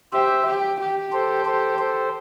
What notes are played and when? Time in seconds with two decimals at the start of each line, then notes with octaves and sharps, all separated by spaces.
0.13 G4 C5 E5
0.45 G4
0.80 G4
1.13 A4 C5
1.45 A4 C5
1.79 A4 C5